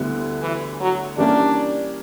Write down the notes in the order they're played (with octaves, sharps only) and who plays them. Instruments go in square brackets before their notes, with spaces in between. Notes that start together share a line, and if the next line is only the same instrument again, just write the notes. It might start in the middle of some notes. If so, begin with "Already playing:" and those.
Already playing: [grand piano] D2 D3 G3 B3 E4
[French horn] E3
F#3
[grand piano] E3 G3 A#3 C#4 G4 [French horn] D4